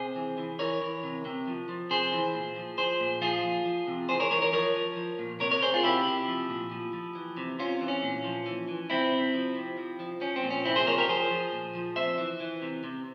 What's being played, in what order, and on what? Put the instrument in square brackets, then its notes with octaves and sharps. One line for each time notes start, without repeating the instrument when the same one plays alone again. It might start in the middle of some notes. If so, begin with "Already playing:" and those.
Already playing: [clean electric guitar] C3 G#4 C5
E3
E3
E3 A#4 C#5
E3
C3
C3
F3
F3
C3 G#4 C5
E3
A#2
F3
F3 G#4 C5
A#2
F3 F4 G#4
F3
F3
C3
E3 G#4 C5
A#4 C#5
E3 A#4 C#5
A#4 C#5
F3 A#4 C#5
F3
F3
A#2
C3 A#4 C#5
A#4 C#5
C3 G#4 C5
F4 G#4
C3 E4 G4
C3
F3
A#2
F3
F3
E3
C3
C3 C#4 F4
E3
C#4
A#2
F3
E3
E3
C3 C4 E4
C3
F3
C3
F3
F3
F3 C#4
C4
A#2
C#4
C3 C4 E4
G#4 C5
F3 A#4 C#5
G4 A#4
F3 G#4 C5
F3
A#2
F3
C3 C5 E5
E3
E3
C3
C3